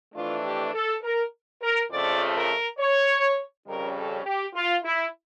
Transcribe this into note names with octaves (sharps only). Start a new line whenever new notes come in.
F2 E3 A3 D4 F4
G4
A4
A#4
A#4
F2 C#3 F3 A3 D5
A#4
C#5
F2 C#3 G3 C#4 A#4
A4
G4
F4
E4